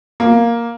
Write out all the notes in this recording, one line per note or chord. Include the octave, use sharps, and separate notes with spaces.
A#3